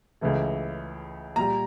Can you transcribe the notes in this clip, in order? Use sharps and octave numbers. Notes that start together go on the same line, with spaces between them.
C#2 C#3 E3 A3
A#2 G3 A#5